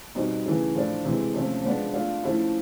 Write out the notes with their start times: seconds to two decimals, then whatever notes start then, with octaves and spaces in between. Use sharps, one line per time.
0.15 B2 G3 C4 D#4
0.46 C#3 E3 A3
0.75 A2 F3 A3 D4
1.05 C3 E3 G#3
1.34 C3 F3 A3 C#4
1.63 F3 G#3 B3 D4
1.94 A3 D4 F4
2.24 F3 A3 C#4 E4